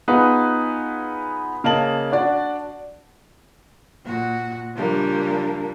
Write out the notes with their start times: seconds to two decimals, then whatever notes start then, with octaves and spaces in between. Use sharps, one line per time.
0.08 B3 D#4 F4 G#4 B4
1.64 C#3 A#3 D#5 A5 F#7
2.12 D4 F#4 D5
4.05 A#2 F#4
4.75 C#3 F3 G3 A#3 D4